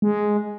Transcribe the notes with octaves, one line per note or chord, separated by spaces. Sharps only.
G#3